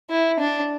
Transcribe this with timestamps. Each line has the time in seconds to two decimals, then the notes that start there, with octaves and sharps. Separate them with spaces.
0.10 E4
0.39 D4